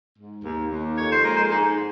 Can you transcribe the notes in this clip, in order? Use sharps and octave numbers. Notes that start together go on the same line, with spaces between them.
G#2
D#2
D#2
F2 C#5
C5
G#3 A#4
C5
G#2 D#4